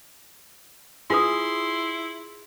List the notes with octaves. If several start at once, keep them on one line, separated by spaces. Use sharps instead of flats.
E4 F4 G#4 B4 C6 D#6